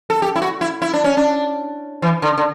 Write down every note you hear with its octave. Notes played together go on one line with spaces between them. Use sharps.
A4
G4
E4
F#4
E4
E4
D4
C#4
D4
E3
D3
D3